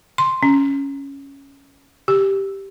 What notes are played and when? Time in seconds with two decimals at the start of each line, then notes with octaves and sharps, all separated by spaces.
0.18 C6
0.43 C#4
2.08 G4